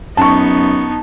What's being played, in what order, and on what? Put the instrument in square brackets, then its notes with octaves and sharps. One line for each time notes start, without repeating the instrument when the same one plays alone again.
[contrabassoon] F#2 [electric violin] B3 D#4 [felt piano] A5 C#6